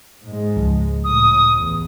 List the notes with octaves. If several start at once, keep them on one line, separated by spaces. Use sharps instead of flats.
G#2 G#3
C#2 F3
A2 D#6
A1 E2